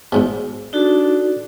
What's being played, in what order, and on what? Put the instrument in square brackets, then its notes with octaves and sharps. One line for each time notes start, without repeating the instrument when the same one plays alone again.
[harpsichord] E2 G#2 B2
[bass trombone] D4 [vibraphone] D#4 F#4 A4